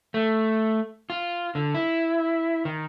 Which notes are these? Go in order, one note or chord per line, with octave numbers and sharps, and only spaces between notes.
A3
F4
D3
E4
D#3